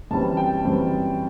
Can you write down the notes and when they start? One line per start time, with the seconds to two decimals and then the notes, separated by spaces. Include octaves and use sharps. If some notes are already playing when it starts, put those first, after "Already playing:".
0.11 F#2 E3 G3 C4 A5
0.37 G5
0.65 F#2 E3 G3 C4